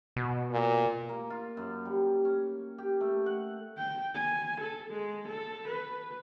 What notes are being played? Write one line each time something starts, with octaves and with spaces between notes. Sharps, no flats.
B2
A#2
A#3
F4
F#2
G3
C#4
G4
A3
F#5
G5
G#5
A4
G#3
A4
B4